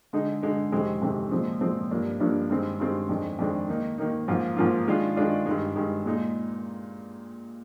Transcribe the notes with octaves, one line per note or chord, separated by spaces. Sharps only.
D3 G#3 D#4
D3 G#3 D#4
F2 C3 D#3 G#3 C4
F2 C3 D#3 G#3 C4
A#2 F3 G#3 C4
A#2 F3 G#3 C4
G2 F3 A#3 D4
G2 F3 A#3 D4
G2 D#3 G#3 C4
G2 D#3 G#3 C4
F2 D#3 G#3 D4
F2 D#3 G#3 D4
D#3 A#3 D#4
D#3 A#3 D#4
G#2 F3 A#3 F4
G#2 F3 A#3 F4
D#3 G#3 D4 F4
D#3 G#3 D4 F4
G2 D#3 G#3
G2 D#3 G#3
A#2 G#3 D#4